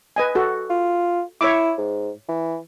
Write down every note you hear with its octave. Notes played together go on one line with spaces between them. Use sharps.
B4 D#5 G#5
F#4 A4
F4
E4 C#5 E5 D6
G#2
E3